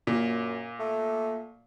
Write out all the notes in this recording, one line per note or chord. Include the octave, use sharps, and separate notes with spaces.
F#2 A#2
A3